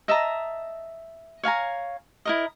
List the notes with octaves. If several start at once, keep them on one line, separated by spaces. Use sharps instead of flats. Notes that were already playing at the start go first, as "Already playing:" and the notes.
D#5 E5 A5 A#5
C#5 F5 G#5 A#5
E4 A#4 D#5